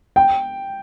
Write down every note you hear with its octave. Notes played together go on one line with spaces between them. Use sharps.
G5